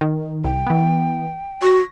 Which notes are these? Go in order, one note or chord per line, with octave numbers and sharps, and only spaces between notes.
D#3
C2 G5
E3 B3
F#4 C#6 A#6